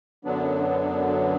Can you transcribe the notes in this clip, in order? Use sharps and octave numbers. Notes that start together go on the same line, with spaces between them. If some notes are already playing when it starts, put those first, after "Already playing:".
F#2 D3 F#3 B3 D4